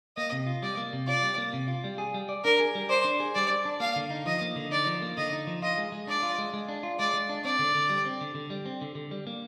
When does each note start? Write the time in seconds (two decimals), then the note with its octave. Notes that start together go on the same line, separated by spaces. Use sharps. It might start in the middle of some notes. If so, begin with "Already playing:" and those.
0.17 A#3 D#5
0.32 C3
0.47 F4
0.63 G3 D5
0.77 A#3
0.93 C3
1.07 F4 D5
1.23 G3
1.38 A#3
1.53 C3
1.68 F4
1.84 G3
1.98 G#4
2.14 G3
2.29 D5
2.44 D4 A#4
2.60 G#4
2.75 G3
2.89 C5 D5
3.05 D4
3.20 G#4
3.35 G3 D5
3.50 D5
3.65 D4
3.80 A#3 F5
3.96 D3
4.10 D#4
4.26 F3 D#5
4.41 A#3
4.56 D3
4.71 D#4 D5
4.86 F3
5.02 A#3
5.17 D3 D#5
5.33 D#4
5.47 F3
5.62 F4 D#5
5.78 G#3
5.92 G#3
6.07 D4 D5
6.23 F4
6.38 G#3
6.54 G#3
6.69 D4
6.83 F4
6.99 G#3 D5
7.14 G#3
7.29 D4
7.44 C4 D5
7.59 D3
7.75 D3
7.89 G3
8.05 C4
8.21 D3
8.35 D3
8.50 G3
8.66 C4
8.81 D3
8.95 D3
9.11 G3
9.27 A#3